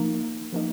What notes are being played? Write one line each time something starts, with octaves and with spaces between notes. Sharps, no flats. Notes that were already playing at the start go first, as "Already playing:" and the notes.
Already playing: F3 A#3 D#4
F3 A#3 D#4